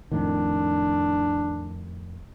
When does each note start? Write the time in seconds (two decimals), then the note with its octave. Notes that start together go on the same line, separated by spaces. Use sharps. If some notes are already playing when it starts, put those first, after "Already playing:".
0.12 F2 A2 D#3 D4